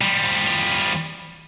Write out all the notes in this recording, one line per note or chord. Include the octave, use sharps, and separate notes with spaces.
F3 G3